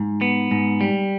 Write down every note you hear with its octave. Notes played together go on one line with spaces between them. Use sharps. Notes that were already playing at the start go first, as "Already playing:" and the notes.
Already playing: G#2
B3
G#2
G3